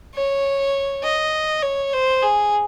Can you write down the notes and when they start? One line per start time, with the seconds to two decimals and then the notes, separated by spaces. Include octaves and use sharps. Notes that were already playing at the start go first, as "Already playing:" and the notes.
0.15 C#5
1.03 D#5
1.62 C#5
1.93 C5
2.22 G#4